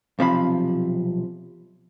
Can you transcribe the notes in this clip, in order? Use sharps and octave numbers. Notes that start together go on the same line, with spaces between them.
B1 C3 F3 B5